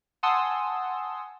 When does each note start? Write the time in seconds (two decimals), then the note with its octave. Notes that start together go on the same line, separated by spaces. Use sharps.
0.23 F#5 G#5 A5 C6 D#6 E6